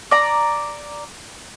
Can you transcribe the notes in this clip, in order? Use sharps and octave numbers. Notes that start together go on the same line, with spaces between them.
D5 A#5